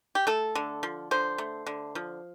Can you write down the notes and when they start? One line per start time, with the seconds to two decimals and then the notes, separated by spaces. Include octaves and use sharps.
0.15 G4
0.27 A3 A4
0.55 D3
0.83 F3
1.11 D3 C5
1.38 A3
1.66 D3
1.95 F3